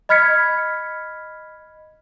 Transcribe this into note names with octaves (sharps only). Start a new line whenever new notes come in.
D#5 B5 F6 G#6 B6 C#7